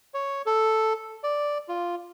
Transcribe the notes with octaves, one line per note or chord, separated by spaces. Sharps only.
C#5
A4
D5
F4